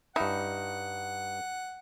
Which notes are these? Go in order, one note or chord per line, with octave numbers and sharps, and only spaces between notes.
G2 D#4 E4 F#5